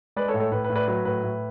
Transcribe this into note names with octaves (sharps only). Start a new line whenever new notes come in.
G#3 B4 D5
A4 C#5
A2
A4 C#5
A2 B4
B4
A2
B4 D5
F#3 B4
A2 B4
A2